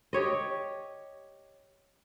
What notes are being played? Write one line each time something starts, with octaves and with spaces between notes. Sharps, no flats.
G4 C#5 D#5